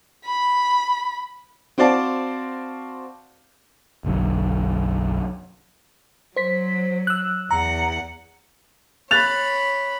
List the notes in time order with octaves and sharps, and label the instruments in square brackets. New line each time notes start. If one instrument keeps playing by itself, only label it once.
[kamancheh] B5
[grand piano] C4 F#4 C5 D5 F5 A5
[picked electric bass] F#1 B1 D3 F#3
[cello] F#3 [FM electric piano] C5 B6
[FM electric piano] E6 F#6
[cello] E2 F#5 [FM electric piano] A#5
[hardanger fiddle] C#5 B5 [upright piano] F#6 A6 F7